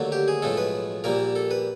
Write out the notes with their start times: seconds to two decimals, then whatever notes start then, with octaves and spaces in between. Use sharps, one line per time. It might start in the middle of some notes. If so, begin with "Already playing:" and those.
Already playing: D#2 D3 F#3 A3
0.12 G4
0.28 G#4
0.42 B1 A2 F3 G#3 A4
0.57 B4
1.04 A#1 A#2 G3 A#3 A#4
1.36 A4
1.51 B4